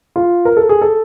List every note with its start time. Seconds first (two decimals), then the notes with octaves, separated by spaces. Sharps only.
0.16 F4
0.45 A#4
0.57 A4
0.69 G#4
0.82 A4